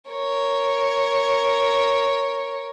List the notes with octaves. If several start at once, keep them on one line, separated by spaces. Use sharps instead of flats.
A#4 C#5